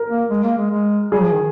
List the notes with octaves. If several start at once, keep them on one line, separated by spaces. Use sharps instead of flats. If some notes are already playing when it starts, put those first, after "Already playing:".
Already playing: A#4
A#3
G#3
A#3
G#3
G#3
G3 G#4
F3
D#3